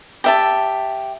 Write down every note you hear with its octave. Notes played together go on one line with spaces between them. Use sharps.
G4 E5 A5